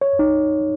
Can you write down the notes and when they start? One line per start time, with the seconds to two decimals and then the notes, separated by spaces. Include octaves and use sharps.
0.01 C#5
0.19 D#4